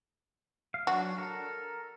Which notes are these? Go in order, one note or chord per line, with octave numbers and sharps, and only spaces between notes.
F5
F#3 D4 F#4
A4 A#4